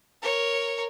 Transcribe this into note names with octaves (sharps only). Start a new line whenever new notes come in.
A#4 C#5